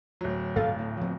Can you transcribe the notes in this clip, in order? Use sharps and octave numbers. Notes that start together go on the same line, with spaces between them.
D1 F#3
G2 B2 D3 A4 F5 A6
A2
F3 B3 C4